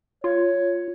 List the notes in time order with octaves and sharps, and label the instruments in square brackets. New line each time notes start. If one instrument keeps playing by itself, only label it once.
[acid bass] F4 [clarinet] C#5